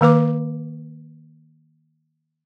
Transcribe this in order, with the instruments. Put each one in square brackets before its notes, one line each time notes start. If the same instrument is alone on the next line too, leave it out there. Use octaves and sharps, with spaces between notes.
[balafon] D#3 A#3 B4 D6